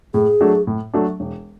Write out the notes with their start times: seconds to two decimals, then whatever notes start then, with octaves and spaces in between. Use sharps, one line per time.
0.14 A2 G#4
0.41 F#3 A3 D4
0.67 A2
0.94 F#3 A3 D4
1.20 E1